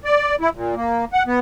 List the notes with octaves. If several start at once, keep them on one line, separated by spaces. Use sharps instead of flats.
D5
E4
A#2
A#3
F#5
B3